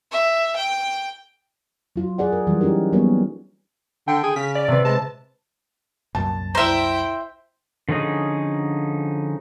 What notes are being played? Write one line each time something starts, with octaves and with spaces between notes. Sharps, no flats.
E5
G5
F#3 F4
G#4 D5 F#5
A#4
E3 F#3 G3
C#4 D#4 G4 A#4
F#3 G3 A#3 B3 A#4 C#5
D3 G5
G#4
C#3 B6
D5
C3 B4
G#3 A5
C2 F#2 A#2 A5
E4 C5 E5 G5 A#5 E7
D3 F3 C#4 D#4 G#4